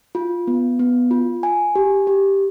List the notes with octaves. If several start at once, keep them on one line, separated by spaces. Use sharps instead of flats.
F4
B3
B3
F4
G#5
G4
G4